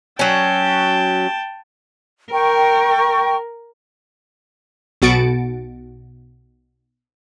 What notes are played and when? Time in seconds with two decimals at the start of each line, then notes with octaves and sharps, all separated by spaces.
0.19 F#3 C#4 G5 A5
2.32 A#4 G5 C#6
5.02 B1 B2 F#4 A6 C#7 D7